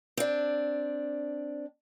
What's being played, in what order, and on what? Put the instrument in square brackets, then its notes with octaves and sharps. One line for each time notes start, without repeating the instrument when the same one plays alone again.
[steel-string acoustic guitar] C4 D4